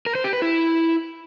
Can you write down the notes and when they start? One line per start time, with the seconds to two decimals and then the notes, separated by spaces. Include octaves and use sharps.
0.06 A#4
0.15 C5
0.24 G4
0.33 B4
0.42 E4